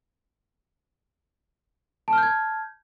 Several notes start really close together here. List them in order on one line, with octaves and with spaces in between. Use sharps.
A5 F6 G6 G#6